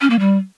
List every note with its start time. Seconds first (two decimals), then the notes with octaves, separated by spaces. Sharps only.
0.01 C#4
0.10 A#3
0.19 G3